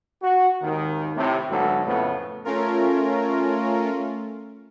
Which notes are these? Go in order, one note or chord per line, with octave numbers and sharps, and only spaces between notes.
F#4
G#1 D#2 D#3
A2 C3
D2 G#2 B2 F#3 A4
F2 A2 C#3 A3 B3
A3 C#4 F4 A#4